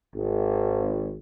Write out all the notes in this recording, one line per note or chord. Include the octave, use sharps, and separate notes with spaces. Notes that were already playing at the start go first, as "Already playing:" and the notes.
G#1